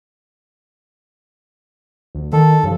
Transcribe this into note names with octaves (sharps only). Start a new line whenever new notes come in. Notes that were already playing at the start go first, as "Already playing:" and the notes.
D2
D#3 A4
G2 C#3 F3